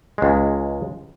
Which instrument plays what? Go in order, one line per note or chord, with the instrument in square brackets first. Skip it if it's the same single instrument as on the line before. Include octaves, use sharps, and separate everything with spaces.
[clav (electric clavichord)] C#2 G#3